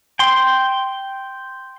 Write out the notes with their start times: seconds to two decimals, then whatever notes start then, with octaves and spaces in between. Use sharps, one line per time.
0.19 G5 C6